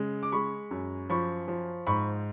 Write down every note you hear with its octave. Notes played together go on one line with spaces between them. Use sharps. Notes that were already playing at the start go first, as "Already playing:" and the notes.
Already playing: C#3 G#3
D6
G#3 B5 C#6
F#2
F3 B5 C#6
F3
G#2 B5 C#6